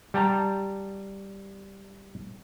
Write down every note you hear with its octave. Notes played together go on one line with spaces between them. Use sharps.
G3 G5 A5 A#5